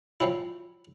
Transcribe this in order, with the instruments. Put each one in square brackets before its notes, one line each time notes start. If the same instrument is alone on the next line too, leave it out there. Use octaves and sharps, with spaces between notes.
[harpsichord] F3 F#3 C4 C#4 E4